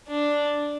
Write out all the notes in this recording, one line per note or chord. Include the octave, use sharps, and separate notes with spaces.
D4